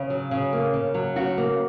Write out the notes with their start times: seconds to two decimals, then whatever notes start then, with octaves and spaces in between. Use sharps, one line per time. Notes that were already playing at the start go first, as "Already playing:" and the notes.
Already playing: C#3
0.10 F#3
0.31 C#3
0.53 A#3
0.73 C#3
0.94 F#3
1.16 C#3 F#4
1.37 A#3